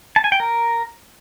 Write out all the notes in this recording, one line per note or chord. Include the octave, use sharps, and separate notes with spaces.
A5
G#5
G5
A#4